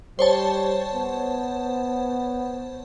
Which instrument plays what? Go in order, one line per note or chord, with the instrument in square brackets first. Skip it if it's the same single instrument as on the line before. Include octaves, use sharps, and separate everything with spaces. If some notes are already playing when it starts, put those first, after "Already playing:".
[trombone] G3 [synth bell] C5 C#5 A5
[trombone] B3